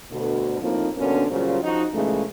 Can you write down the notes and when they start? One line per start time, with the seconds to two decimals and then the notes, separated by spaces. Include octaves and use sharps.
0.11 D2 B2
0.61 A2 F3 A#3 C4 D#4
0.97 F#2 B2 D3 A#3 C#4 D4
1.30 A#2 C#3 F#3 G3 F4 C5
1.62 F3 D#4 F#4
1.93 A#2 C#3 E3 G#3 A3